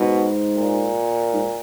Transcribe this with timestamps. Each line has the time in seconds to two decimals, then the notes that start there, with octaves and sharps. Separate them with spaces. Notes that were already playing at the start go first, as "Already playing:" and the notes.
Already playing: G#2 B2
0.56 A#2
1.33 G#2